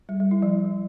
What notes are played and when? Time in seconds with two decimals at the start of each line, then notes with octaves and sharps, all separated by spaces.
0.09 G3
0.20 G3
0.31 E4
0.43 F3